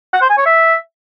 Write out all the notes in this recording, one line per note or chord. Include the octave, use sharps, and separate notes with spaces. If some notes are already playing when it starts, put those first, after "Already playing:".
F#5
C5
G#5
C#5
E5